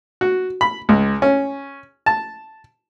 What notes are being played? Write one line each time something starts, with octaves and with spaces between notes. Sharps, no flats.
F#4
B5
C#2
C#4
A5